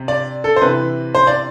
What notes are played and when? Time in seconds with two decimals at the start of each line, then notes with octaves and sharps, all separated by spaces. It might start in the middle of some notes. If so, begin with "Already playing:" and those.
Already playing: C3
0.08 D5
0.44 A4
0.56 C5
0.62 C3 E3 B4
1.15 C5
1.27 D5